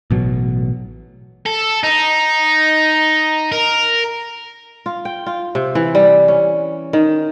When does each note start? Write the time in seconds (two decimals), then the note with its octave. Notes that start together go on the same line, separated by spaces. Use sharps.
0.11 A1 B2 F#3
1.46 A4
1.83 D#4
3.52 A#4
4.86 F4
5.05 G5
5.26 F4
5.55 C3
5.75 E3
5.95 G3
6.28 C#4
6.93 D#3